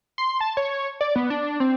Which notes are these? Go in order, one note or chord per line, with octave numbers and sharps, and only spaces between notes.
C6
A5
C#5
D5
B3
D4
C4